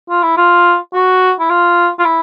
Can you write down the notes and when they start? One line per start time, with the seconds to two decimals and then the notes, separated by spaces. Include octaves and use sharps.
0.10 F4
0.23 E4
0.37 F4
0.93 F#4
1.40 E4
1.50 F4
1.99 F4
2.05 E4